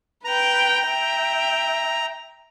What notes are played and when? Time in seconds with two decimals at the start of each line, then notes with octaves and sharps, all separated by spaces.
0.25 B4 G5 A#5
0.85 E5 G5